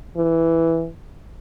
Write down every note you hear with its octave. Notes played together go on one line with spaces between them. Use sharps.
E3